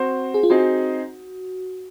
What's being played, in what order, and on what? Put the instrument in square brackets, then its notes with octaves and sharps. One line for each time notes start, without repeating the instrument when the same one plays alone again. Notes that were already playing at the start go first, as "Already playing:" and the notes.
Already playing: [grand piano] C4 F#4 C5
[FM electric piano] G#4
F4
[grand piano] C4 D#4 G#4 C5 [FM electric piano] F#4